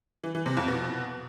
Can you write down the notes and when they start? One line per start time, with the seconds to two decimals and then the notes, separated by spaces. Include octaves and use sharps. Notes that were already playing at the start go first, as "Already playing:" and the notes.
0.24 E3
0.35 E3
0.46 C3
0.57 F2
0.68 B2